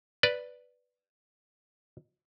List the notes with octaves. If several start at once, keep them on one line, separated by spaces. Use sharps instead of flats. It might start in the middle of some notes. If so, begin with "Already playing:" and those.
B4 D5